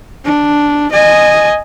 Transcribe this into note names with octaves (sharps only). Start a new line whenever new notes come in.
D4
D#5 G#5